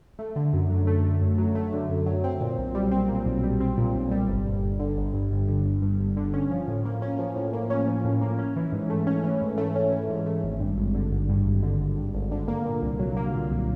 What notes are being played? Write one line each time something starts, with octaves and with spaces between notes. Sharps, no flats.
A3
D3
F#2
F#3
A3
D3
F#2
F#3
A3
D3
F#2
F#3
C4
A#2
B1
G3
C4
A#2
B1
G3
C4
A#2
B1
G3
G1
G2
G1
D3
G1
G2
G1
D3
G1
G2
G1
D3
C#4
F3
A2
A#3
C#4
F3
A2
A#3
C#4
F3
A2
A#3
C#4
E3
G#2
A3
C#4
E3
G#2
A3
C#4
E3
G#2
A3
G#1
G2
G#1
D3
G#1
G2
G#1
D3
G#1
G2
G#1
D3
A#3
A#2
C2
F#3
A#3
A#2
C2